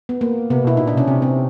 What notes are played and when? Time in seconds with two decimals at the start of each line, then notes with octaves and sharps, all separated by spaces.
0.09 B3
0.21 A#3
0.50 C3 B3
0.64 B2 E4
0.77 A#2 D#4
0.87 D4
0.94 C3 C#4
1.08 C3 C4
1.22 C4